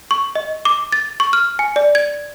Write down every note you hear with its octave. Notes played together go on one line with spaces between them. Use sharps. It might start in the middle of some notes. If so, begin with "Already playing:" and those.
C#6
D#5
D6
A6
C#6
F6
G#5
D5
G#6